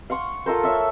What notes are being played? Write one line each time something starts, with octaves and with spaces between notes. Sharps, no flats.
F5 F#5 C6 C#6
F4 A4 A#4 C5
C#5 E5 E6